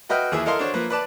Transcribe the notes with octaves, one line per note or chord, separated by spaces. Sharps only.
F#4 B4 D#5 G5 F6
D#2 E3 G#4 E5
E4 A4 A#4 D#5 F5 C6
D4 F#4 C5 C#5
F3 A#3 B4
B4 D5 A5